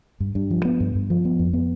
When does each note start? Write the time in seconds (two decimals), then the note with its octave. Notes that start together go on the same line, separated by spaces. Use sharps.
0.20 G2
0.35 G2
0.51 F3
0.65 B3
0.80 G2
0.95 G2
1.10 F3
1.25 B3
1.39 F2
1.53 B3